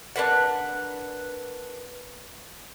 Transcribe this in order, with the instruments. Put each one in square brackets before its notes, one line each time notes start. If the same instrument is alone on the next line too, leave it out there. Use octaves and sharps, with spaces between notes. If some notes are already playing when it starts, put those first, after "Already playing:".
[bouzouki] D4 A#4 B4 F#5